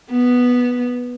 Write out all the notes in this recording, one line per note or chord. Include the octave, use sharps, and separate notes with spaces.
B3